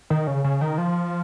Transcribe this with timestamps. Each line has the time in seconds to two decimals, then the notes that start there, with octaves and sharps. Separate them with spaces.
0.10 D#3
0.27 C#3
0.44 C#3
0.61 D#3
0.78 F3